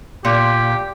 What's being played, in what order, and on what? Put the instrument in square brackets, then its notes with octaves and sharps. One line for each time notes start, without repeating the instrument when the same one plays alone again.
[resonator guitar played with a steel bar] A#2 [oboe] G4